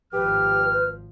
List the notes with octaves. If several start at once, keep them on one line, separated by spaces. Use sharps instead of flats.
G#1 F3 G4 B4 F6